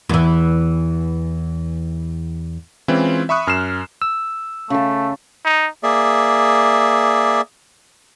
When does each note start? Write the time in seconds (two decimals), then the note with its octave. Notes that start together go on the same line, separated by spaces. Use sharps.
0.09 E2 E3
2.88 E3 G#3 C4 C#4 E4 F4
3.29 E5 B5 C#6 D#6 F#6
3.47 F#2 F6 C7 E7
4.02 E6
4.70 C#3 A3 A5
5.45 D#4
5.83 A#3 G#4 D5 E5